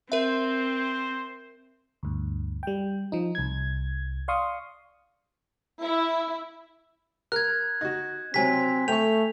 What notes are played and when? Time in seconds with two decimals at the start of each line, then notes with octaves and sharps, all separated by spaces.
0.12 C4 A#4 C5 E5
2.03 D2 G2
2.63 G3 G5
3.12 F3 D#4
3.35 C2 G#6
4.28 D5 F5 C6 C#6 D#6
5.84 E4
7.32 A#4 F#6 G#6
7.81 D#4 F#4
8.34 C3 F#3 C4 G#5 B6
8.88 A3 G5 C#6 F7